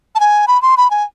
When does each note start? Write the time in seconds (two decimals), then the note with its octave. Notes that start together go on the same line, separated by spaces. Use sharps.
0.15 A5
0.20 G#5
0.48 B5
0.62 C6
0.77 B5
0.91 G#5